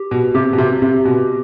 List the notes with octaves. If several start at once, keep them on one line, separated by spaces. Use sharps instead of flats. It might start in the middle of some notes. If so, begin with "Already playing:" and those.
Already playing: G4
B2
C3 G4
B2
C3
C3
B2